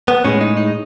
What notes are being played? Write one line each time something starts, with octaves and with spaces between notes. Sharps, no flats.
B3
A2 G#3 C#4
D#4
D#4